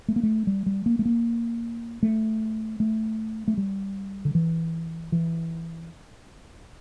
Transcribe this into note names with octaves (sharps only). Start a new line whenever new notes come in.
A3
A#3
A3
G3
G3
A#3
A3
A#3
A3
A3
A3
G3
D3
E3
E3